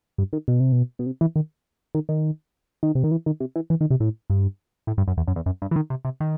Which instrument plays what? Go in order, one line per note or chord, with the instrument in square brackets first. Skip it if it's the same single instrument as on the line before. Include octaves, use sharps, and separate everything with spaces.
[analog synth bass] G2
D#3
B2
C3
B2
B2
C3
E3
D#3
D#3
D#3
D#3
C3
D#3
E3
D#3
C3
E3
E3
D#3
C3
A2
G2
A2
G2
F#2
E2
F#2
E2
F#2
G2
E3
D#3
C3
C3
D#3